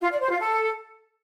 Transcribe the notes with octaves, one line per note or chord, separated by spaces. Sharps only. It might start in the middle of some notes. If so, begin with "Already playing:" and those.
F4
D5
C5
F4
A4